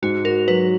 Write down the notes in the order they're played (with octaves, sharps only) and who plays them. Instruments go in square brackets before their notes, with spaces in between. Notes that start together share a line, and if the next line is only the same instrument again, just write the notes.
[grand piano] G#2 [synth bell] F#4
[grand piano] F#4 [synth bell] A#4
[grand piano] F#3 [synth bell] B4